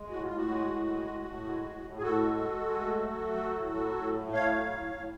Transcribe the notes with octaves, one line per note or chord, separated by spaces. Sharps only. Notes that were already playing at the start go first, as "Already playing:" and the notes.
Already playing: G#3
A2 F#4
F4
A2
F#4
G#3
A2
G#3
A2
A2
G#3
A2
A2
G#4
A2 F#4 A4
G#3
G#3
G#3
A3
F#3
A3
F#3
A2
F#3
A2
A3
A2 C#5 F5
F#3
A2
A2